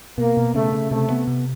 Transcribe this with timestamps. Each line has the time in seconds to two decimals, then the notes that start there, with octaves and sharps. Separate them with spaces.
0.18 B2 A#3
0.37 B2
0.54 C#3 A3
0.72 C#3
0.91 C3 A3
1.10 B3
1.27 C3